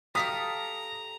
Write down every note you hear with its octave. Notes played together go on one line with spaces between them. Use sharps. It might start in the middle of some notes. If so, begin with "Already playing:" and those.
G4 A4 F5 A#5 D#6 B6